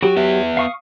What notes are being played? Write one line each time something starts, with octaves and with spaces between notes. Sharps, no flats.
F#3 F#4 G4
B3 B4 E5
F5 C#6 D#6